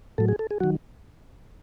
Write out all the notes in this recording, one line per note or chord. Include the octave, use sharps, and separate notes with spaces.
A2 F#3 A4
G#4
A4
G#4
D#3 F#3 F#4